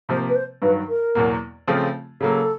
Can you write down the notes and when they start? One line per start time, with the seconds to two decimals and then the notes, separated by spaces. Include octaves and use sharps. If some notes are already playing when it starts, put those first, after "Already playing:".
0.09 C3 F3 A#3 C5
0.29 B4
0.36 C5
0.62 G2 D#3 F#3 B4
0.89 A#4
1.15 E2 B2 F#3 A#3
1.67 C#3 F3 A3 C4 F4
2.21 C#3 F#3 A#3 A4